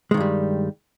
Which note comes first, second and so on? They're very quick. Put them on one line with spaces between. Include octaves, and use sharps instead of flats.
G#3 D#3 G2 G3